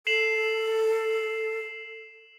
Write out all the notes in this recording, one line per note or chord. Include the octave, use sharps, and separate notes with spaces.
A4 C7 E7 F#7